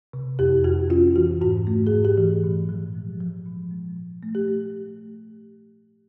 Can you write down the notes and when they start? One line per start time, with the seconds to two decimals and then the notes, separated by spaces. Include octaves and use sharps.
0.13 C3
0.39 F2 G4
0.64 F2 F#4
0.90 C#4 F4
1.16 E3 F#4
1.41 G#2 F#4
1.67 A3
1.87 G#4
1.92 G#2
2.05 G4
2.18 E3
2.44 A#2
2.69 F3
2.95 G#3
3.21 F3
3.46 A#2
3.71 G#3
3.97 A#2
4.23 A3
4.35 G4
4.48 A3